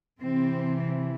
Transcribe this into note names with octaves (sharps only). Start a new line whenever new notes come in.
C3 E3 C4